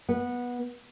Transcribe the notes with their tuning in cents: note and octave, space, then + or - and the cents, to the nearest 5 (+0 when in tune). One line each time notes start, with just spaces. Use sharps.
B3 -15